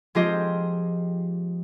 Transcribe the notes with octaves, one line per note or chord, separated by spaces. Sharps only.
F3 G#3 C4 F4 G4 D#5